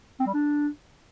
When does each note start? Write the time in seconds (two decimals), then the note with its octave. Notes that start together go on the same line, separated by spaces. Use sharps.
0.20 C4
0.27 G3
0.34 D4